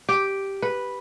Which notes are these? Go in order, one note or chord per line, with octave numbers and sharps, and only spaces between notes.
G4
B4